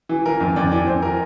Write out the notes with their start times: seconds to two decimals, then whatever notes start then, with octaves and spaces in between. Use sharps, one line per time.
0.09 E3
0.26 E3 A#4
0.40 F2
0.56 F2 D5
0.72 E3 D5
0.87 F2 C5
1.02 E3 A#4